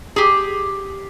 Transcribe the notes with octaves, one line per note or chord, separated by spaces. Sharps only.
G4 G#4